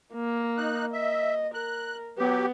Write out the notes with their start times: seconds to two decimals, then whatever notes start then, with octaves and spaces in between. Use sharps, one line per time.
0.14 A#3
0.57 D#4 F#6
0.93 D#5 E5
1.54 A#4 F#6
2.18 F#3 B3 G4